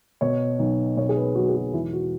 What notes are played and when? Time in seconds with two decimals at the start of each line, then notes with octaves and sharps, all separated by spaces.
0.21 B2 C#5
0.59 B1
0.97 B2 C#5
1.09 G#4
1.16 B4
1.35 F#3 F#4
1.49 G#4
1.54 F#4
1.73 E1 E4
1.93 F#4